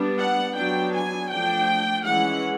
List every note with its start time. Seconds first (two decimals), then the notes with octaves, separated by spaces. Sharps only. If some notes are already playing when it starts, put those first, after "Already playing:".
Already playing: G3 B3 D4
0.18 F#5
0.56 F#3 B3 D4 G5
0.94 G#5
1.30 F3 A3 D4 G5
2.05 E3 G#3 C#4 F#5